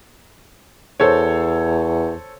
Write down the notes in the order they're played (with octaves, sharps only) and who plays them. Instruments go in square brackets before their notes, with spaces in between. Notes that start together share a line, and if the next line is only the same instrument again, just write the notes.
[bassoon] E2 [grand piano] A4 C5 C#5